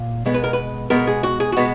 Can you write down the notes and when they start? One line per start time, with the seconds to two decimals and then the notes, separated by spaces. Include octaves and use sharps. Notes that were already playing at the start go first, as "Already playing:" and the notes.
Already playing: A#2
0.26 B2 G#3 B3
0.34 B4
0.44 A#4
0.53 B4
0.90 B2 G#3 B3 A#4
1.07 G#4
1.23 F#4
1.40 G#4
1.52 B2 G#3 B3 F#4